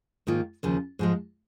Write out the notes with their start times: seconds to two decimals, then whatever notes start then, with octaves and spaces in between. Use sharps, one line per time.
0.27 G#2 D#3 A#3 F4
0.63 D#2 C#3 F3
0.99 G#2 F3 G#3